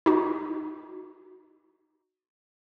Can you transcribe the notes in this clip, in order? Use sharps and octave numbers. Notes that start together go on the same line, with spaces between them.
D#4 F#4